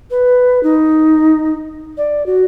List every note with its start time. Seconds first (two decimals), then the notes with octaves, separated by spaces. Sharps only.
0.11 B4
0.63 D#4
1.98 D5
2.26 F#4